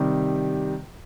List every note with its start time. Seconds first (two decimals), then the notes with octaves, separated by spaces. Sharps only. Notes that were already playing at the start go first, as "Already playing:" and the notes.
Already playing: C3 D#3 G3